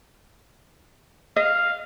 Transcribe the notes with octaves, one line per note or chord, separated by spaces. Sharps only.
D#5 F5